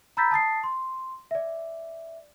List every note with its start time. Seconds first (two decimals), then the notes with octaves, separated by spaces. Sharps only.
0.17 A#5 B5 E6 G6 A6 B6
0.31 A5 D#6 A6 C7
0.63 C6
1.31 D5 E5